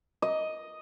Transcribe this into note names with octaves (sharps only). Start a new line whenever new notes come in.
D#5